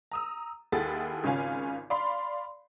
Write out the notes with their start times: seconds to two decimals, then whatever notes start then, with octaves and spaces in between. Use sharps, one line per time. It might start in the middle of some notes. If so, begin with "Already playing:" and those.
0.12 A#5 D#6 E6
0.72 D#2 E4 G#4 A4 F#5 A6
1.24 G#1 C#3 C#4 F4 F5 G#5
1.90 D5 F5 B5 C6